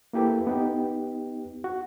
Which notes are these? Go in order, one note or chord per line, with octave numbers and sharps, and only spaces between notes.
A#3 E4 G4 A4 B4
B3 D#4 G4
F#4